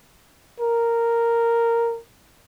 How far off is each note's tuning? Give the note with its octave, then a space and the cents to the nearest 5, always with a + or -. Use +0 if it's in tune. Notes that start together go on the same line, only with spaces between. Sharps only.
A#4 -5